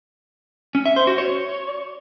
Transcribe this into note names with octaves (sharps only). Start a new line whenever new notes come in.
C#4
E5
C5
F#4
C#5